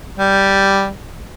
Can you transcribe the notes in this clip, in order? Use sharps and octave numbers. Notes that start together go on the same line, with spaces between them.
G3